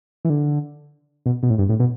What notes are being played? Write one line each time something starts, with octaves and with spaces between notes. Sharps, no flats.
E3
D3
B2
B2
A2
G2
A2
B2